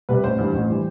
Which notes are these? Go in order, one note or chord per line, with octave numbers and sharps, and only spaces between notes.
C3 G3 B4
A1 C5
G2 E3 G3
A1
E3 G3